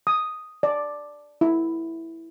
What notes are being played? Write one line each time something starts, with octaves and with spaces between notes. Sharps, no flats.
D#6
D5
E4